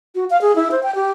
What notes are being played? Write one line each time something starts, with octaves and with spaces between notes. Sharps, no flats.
F#4
F5
G#4
E4
C5
G5
G4